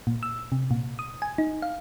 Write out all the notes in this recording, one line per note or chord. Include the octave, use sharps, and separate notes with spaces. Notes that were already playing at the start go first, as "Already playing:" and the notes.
A#2
E6
C3
A#2
D#6
G#5
D#4
F5